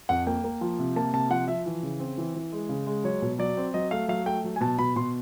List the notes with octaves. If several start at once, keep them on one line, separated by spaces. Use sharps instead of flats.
F2 F#5
A#3 G5
A#3
F3
C3
A#3 A5
C3 A5
F3 F#5
F3 E5
E3
C#3
C4
E3
E3
G#3
C#3
G#3
F#3 C#5
B2
F#3 D5
C4
F#3 D#5
A3 F5
F#3 F5
A3 G5
F#3
G#5
B2 A5
B2 B5
B2 C6